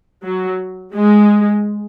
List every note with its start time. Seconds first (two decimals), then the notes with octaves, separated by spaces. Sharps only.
0.24 F#3
0.95 G#3